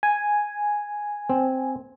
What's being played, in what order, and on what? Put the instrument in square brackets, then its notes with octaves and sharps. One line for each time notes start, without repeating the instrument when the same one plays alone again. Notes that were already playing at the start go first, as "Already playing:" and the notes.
[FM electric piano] G#5
[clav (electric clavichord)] C4